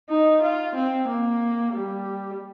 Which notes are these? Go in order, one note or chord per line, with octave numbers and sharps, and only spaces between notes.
D#4
F4
C4
A#3
G3